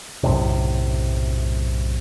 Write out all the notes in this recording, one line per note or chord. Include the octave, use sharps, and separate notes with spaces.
B1 F#2 A2 C3